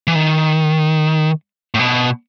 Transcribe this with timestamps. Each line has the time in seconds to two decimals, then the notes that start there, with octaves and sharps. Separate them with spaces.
0.07 E3
0.15 D#3
1.74 A2
1.79 B2